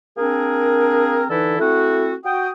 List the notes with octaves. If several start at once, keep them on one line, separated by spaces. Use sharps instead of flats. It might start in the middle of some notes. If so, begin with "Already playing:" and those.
A#3 C4 D4 G#4 A#4
D3 E3 D#4 E4 A4 B4
A3 C4 E4 F#4
F#4 G5 D#6